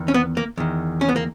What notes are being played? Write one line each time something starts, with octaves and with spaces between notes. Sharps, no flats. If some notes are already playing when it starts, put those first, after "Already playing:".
Already playing: E2 D#3
C#4
B3
A#3
E2 D#3
C#4
B3
A#3